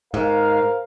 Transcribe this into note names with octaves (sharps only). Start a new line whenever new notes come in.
G#2 A#4 C5 F5